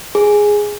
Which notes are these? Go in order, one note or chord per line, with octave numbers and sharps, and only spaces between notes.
G#4